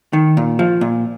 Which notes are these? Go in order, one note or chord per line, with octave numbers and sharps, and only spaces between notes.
D#3
A#2
F3
A#2